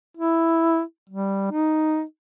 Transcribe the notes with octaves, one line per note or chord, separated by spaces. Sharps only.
E4
G3
D#4